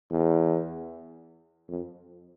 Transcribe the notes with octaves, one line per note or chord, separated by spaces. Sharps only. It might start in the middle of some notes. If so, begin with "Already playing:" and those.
E2
F2